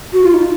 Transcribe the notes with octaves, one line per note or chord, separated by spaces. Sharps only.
F#4
F4
D#4